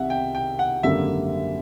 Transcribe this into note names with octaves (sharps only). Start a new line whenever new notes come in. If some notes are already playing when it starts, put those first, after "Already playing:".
Already playing: C2 C3 D#3 E5 F#5
G5
G5
F#5
G#1 F#2 D3 G3 A#3 E5